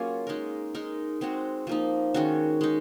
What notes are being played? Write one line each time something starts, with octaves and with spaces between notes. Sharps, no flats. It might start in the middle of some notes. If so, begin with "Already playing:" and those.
Already playing: F#3 A#3 C#4 F4 G#4
G#3 D#4 A#4
G#3 D#4 A#4
G#3 C4 F#4
F3 A#3 D#4
D#3 G#3 C#4 F#4
G#3 D#4